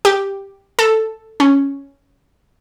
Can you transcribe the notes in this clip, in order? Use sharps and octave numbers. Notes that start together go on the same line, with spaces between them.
G4
A4
C#4